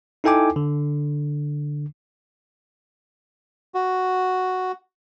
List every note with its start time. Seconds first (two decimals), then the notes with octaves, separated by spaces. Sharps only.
0.24 D#4 E4 A4 G5 G#5 D6
0.56 D3
3.74 F#4